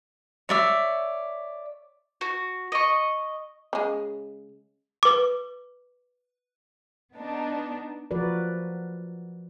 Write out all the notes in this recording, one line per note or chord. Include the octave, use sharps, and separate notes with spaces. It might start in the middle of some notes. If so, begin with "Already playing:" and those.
C#5 D5 E5
F#4
D#5 C#6
C#3 G#3
B4 D6
B3 D4 D#4
F3 F#4 A#4 B4 D5